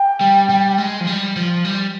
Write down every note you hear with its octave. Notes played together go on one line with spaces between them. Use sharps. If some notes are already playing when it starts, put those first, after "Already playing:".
Already playing: G5
G3
G3
G#3
F3
G3
F3
G3